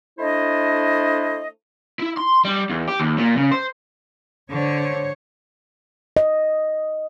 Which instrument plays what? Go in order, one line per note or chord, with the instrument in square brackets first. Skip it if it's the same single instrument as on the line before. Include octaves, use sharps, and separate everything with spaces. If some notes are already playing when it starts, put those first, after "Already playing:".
[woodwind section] A3 D4 E4 C5 D#5
[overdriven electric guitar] E4
C6
G3
E2
G4
D#2
A#2
C#3
C5
[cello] D3 [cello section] C5 C#5
[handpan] D#5